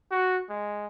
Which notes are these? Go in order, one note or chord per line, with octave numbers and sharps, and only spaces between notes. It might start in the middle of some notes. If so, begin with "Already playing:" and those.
F#4
G#3